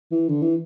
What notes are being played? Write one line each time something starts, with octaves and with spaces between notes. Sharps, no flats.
E3
D3
E3